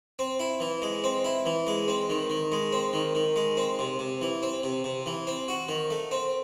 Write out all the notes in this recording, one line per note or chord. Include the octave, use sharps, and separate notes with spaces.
C4
E4
E3
G#3
C4
E4
E3
G#3
C4
D#3
D#3
G#3
C4
D#3
D#3
G#3
C4
C3
C3
E3
C4
C3
C3
E3
C4
F#4
D#3
A3
C4